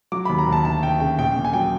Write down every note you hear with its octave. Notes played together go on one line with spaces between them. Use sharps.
F#3 D6
D#2 B5
A#5
D#2
A5
D2 A5
D2 G5
C#3 G5
A#1 G5
A#2
G#5
F#3 G5